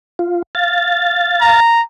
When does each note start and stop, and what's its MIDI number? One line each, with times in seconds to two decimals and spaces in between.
0.19 0.42 65
0.55 1.60 77
0.55 1.60 93
1.41 1.81 82